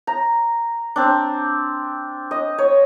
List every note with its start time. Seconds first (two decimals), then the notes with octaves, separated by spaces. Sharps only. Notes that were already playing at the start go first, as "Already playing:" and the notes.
0.07 A#5
0.96 C4 D4
2.31 D#5
2.58 C#5